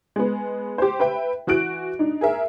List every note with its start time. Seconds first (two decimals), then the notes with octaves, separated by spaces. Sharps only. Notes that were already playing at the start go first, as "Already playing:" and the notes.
0.16 G#3 B3
0.78 G4 C5
1.00 B4 E5 G5
1.47 E3 F#4 F#6 D7
1.99 D4 D#4
2.21 G#4 A#4 E5